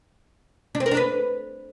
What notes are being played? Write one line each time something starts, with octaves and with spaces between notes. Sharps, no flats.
D4
C4
A#4
D4
B4